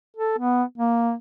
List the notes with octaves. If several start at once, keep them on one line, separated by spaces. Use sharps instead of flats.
A4
B3
A#3